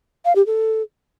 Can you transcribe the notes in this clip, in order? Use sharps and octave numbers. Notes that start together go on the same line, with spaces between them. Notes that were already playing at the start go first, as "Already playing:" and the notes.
F5
G4
A4